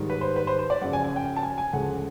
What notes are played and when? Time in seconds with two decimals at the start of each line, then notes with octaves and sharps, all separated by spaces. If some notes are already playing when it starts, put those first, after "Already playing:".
Already playing: G#2 D#3 G3
0.10 B4
0.21 C5
0.36 B4
0.47 C5
0.59 C5
0.70 D5
0.81 F#2 C#3 F3 F#5
0.93 G#5
1.04 G#5
1.16 G5
1.36 A5
1.43 G#5
1.58 G#5
1.73 D2 C#3 F3 G#3 F#5